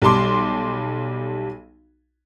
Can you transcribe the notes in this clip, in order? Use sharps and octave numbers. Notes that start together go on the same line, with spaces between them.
B1 G3 A5 C6 D6